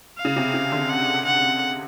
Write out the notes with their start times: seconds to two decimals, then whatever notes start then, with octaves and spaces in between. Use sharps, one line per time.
0.18 F5
0.25 C#3
0.36 C3
0.54 C#3
0.72 D3
0.90 F#5
1.26 F#5